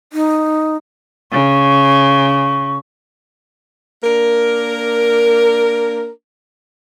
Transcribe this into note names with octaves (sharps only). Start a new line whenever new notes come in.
D#4
C#3 C#6
A#3 D4 A#4